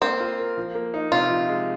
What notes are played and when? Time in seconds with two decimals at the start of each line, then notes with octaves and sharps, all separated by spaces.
0.01 A#3 C4
0.20 F4
0.39 A#4
0.57 F3
0.75 A#3
0.94 D#4
1.11 C3 F4
1.30 F3
1.49 G#3